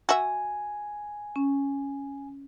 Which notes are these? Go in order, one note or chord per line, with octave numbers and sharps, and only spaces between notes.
F#4 E5 G#5
C#4